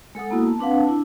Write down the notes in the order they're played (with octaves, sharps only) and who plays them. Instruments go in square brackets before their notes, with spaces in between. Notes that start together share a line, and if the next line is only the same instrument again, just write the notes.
[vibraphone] G#3 A4 F#5 D#6
A#3 B3 E4 F#4
A5
C4 D4 B4 F5 F#5
A5
D4 E4